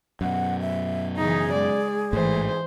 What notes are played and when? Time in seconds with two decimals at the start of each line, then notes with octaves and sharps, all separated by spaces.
0.21 F#2 B2 F#5
0.61 E5
1.17 C#3 E3 D#4 G#4
1.52 G#3 D5
2.13 A1 G#2 E3 A3 C5